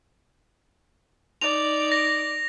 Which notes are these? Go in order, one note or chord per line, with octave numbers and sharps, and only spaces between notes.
D#4 D5 F7
A#6